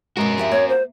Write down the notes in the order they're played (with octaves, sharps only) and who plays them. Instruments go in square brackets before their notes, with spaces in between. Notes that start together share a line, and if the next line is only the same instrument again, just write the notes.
[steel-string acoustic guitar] B2 G#3 [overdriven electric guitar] F#4 A#4
[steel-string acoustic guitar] F3 G4 E5
[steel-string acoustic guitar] A#3 [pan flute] C#5
[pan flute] C5